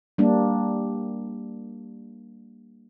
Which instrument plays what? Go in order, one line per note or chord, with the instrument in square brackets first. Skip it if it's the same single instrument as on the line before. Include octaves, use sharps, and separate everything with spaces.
[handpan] G3 A#3 D4